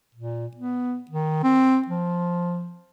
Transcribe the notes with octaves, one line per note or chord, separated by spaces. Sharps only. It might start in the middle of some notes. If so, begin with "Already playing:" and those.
A#2
B3
D#3
C4
F3